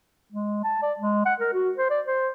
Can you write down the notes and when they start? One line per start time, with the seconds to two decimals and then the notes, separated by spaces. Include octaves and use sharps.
0.32 G#3
0.64 A5
0.82 D5
0.99 G#3
1.26 F#5
1.40 A#4
1.54 F#4
1.78 C5
1.90 D5
2.07 C5